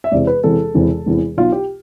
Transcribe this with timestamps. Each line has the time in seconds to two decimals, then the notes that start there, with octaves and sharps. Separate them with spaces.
0.04 E5
0.12 E1 E2 C3 E3 D5
0.27 B4
0.44 E1 E2 C3 E3 A4
0.74 E1 E2 C3 E3
1.06 E1 E2 C3 E3
1.37 B1 B2 F4
1.52 G4